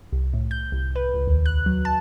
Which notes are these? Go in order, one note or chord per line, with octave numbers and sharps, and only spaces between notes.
C2
A2
G6
C2
B4
C#2
D#2
F#6
F#3
A5